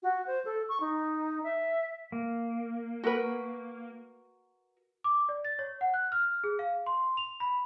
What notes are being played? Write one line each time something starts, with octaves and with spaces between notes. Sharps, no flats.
F#4
C5
A4
C#6
D#4
E5
A#3
F#4 A#4 B4
D6
D5
A6
C#5
F#5
F#6
F6
G#4
F5
C6
F7
B5